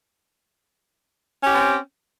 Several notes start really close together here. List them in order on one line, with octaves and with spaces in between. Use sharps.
C#4 G4 C4